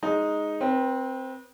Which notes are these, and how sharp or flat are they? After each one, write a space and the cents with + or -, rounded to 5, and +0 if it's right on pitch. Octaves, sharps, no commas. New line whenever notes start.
G#3 +0 D#4 +0
C4 +0 B4 -35